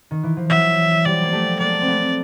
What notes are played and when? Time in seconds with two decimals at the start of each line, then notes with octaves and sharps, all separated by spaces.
0.11 D#3
0.23 E3
0.37 F3
0.50 E3 F#3 E5
1.05 F3 G3 D5
1.23 A#3
1.32 G3 A3
1.59 G#3 A#3 D5
1.82 C4
1.87 A3 B3